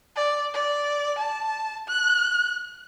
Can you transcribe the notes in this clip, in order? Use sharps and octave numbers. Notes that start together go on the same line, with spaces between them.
D5
D5
A5
F#6